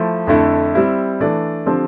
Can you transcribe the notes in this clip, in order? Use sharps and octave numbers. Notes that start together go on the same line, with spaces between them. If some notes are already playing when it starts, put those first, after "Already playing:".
Already playing: F3 A3 E4
F2 D3 A3 E4
G3 C4 E4 G4
E3 A3 D4 A4 D5
D3 F3 C4 G4 C5